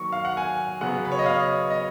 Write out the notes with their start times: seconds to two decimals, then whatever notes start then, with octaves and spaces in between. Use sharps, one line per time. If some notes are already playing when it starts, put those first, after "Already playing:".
Already playing: D#3 F#3 A#3 C#6
0.12 F5
0.25 F#5
0.37 G#5
0.81 C#3 F#3 B3 F#5
1.05 B4
1.12 C#5
1.19 D#5
1.26 F5
1.70 D#5